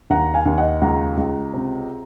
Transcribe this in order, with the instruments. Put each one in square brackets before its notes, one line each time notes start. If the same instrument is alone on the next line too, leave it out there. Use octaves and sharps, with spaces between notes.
[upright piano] D#2 F#5 A#5
F5 G#5
D#2
D#5 F#5
C#2 F#5 A#5
C#2
C3